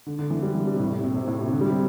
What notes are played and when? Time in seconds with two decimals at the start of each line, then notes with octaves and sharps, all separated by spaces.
0.06 D3
0.19 D3
0.31 E3
0.43 G3
0.55 E3
0.67 G3
0.74 C3
0.79 A2
0.92 C3
1.03 C3
1.15 C3
1.27 A2
1.40 C3
1.52 D3
1.61 G3
1.70 C3